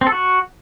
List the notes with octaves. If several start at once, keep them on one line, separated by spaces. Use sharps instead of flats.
C4
A4
F#4